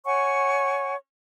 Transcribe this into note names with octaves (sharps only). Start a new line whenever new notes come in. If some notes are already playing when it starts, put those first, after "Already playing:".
C#5 F#5 G#5 C#6